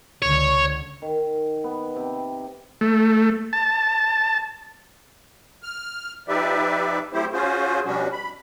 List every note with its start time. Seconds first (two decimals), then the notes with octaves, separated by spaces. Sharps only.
0.22 C#2 D3 C#5
1.02 D#3
1.64 B3
1.96 C3
2.81 A3
3.53 A5
5.63 F6
6.28 F3 D#4 G4 B4 D5 E5
7.13 F#3 A3 C4 E4 G4 C5
7.33 C#4 F4 F#4 G#4 C5
7.85 B2 F3 G3 C#4 D4 F#4
8.12 B5